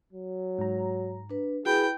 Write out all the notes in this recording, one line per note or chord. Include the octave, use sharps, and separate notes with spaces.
F#3
G#2 A#5
D4 B4
E4 F#4 G#4 B4 G5 B5